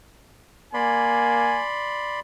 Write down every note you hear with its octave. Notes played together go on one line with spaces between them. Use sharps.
A#3 D5 G#5 B5 C6